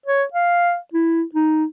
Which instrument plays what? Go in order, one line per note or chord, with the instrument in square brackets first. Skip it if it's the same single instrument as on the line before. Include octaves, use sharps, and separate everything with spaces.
[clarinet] C#5
F5
E4
D#4